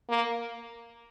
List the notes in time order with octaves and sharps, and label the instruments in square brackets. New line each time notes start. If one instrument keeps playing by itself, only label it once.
[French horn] A#3